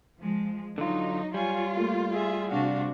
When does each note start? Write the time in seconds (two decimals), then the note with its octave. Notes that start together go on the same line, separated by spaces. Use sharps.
0.18 F3 G#3
0.78 D3 F#3 D#4 F4
1.34 G3 F4 C#5 G#5
1.76 A3 A#3
2.11 G#4 E5
2.51 C3 D4 F#4 F5